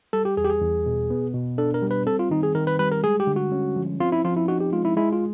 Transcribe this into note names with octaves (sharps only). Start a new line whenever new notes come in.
G3 A4
G4
E2 G#4
G4
G#4
E2
B2
B3
B2
D4 A4
A#4
G3
B4
C4 A4
F4
D#3 D#4
G#4
D#3 A#4
B4
G3 B4
A#4
G#3 G#4
G4
D3
F#4
C#4
F3
C4 F4
E4
F3 F4
E4
D#4 F#4
G4
G#3 F4
E4
G#3 E4
F4